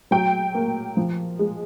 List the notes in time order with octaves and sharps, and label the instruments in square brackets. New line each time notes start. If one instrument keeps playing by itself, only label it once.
[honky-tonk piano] F#3 G5
A#3
F3
G#3